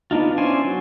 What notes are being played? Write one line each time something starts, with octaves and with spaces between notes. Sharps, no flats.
B3 D4 D#4 F4
C#4 E4 C5 D5 G#5
F#3